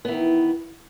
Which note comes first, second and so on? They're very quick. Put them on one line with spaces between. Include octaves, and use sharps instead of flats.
B3 E3 D#3